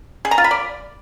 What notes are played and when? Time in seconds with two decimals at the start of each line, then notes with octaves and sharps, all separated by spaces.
0.25 G#4
0.31 A#5
0.38 F4
0.44 B5
0.51 D5